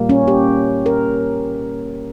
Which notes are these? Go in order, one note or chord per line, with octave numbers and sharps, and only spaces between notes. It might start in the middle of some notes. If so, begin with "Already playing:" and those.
Already playing: A#2 G3 A#3
C#4
G4
A#4